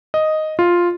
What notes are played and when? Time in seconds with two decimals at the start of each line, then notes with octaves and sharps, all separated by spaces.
0.14 D#5
0.59 F4